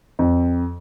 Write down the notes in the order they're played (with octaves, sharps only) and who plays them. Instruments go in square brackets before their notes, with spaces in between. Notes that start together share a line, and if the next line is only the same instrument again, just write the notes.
[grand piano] F2